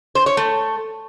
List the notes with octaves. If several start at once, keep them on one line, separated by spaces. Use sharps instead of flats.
C5
C#5
A3